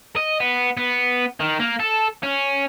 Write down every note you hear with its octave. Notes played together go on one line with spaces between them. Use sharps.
D#5
B3
B3
D#3
A#3
A4
C#4